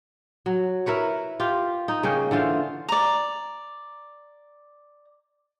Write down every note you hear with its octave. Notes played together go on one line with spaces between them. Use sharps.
F#3
E4 A#4 B4 C#5
F4 G4
D#4
C#3 A#3 C#4 G5
D3 E3 F4 C5
D5 A#5